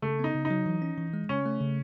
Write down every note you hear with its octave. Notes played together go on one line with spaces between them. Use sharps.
C#3 A3
B3 D#4
C#3
D#4
F#3
E3
C#4
E3
G#3
C#3 C#4
A3
C#3